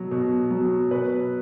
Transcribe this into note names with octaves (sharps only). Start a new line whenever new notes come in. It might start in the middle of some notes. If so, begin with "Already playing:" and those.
Already playing: B2 F#3
B2
F#3
B2 B4